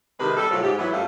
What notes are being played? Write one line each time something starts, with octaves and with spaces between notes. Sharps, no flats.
C3 D#3 G#3 G4 B4
G3 A4
A2 C3 F3 F#3
G#2 G4
E3 F#3 B3 E4
F#2 G3 A3 F4 C5